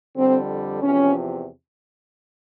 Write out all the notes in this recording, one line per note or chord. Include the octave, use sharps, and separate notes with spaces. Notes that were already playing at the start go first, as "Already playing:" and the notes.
F2 D3 G3 C4
E2 C3 F3 C#4